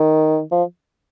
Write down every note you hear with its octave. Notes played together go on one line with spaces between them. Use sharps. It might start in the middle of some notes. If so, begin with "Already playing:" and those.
Already playing: D#3
F3